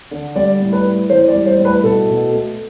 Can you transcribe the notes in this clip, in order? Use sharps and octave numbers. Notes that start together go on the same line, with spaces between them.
D3
G3 D5
A2
B4
A2
E3 C5
D5
G3
C5
A2
B4
B2 A4
B2
A3